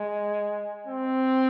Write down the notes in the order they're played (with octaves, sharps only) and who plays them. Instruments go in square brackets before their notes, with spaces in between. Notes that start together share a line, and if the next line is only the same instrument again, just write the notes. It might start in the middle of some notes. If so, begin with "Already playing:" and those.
Already playing: [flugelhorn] G#3
C4